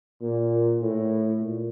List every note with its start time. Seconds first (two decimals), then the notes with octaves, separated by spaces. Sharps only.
0.21 A#2
0.81 A2
1.40 A#2